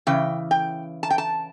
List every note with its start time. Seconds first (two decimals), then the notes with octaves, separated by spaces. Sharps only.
0.07 C#3 E3 G5
0.51 G5
1.03 A5
1.10 G5
1.18 A5